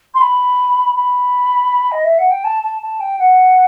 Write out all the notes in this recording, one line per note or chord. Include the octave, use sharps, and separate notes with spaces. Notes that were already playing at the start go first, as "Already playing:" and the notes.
C6
B5
B5
D#5
E5
F#5
G5
A5
A5
A5
G5
F#5